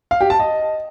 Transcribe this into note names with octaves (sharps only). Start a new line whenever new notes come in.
F5
G4
A5
D#5